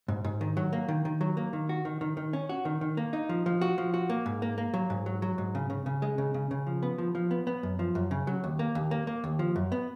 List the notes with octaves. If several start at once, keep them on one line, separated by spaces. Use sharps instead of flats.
G#2
G#2
D#3
F#3
A#3
D#3
D#3
F#3
A#3
D#3
F#4
D#3
D#3
D#3
C#4
F#4
D#3
D#3
A#3
D#4
F3
F3
F#4
F3
F#4
A#3
G#2
A#3
A#3
F#3
G#2
F#3
F#3
G#2
C#3
C#3
C#3
G#3
C#3
C#3
C#3
F3
B3
F3
F3
B3
B3
F#2
F3
F#2
C#3
F#3
D#2
A#3
D#2
A#3
A#3
D#2
F3
F#2
B3